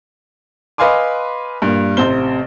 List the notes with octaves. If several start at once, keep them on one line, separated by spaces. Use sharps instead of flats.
B4 D#5 F5 G#5 C6 D6
G2 A#2
A1 C3 C5 G7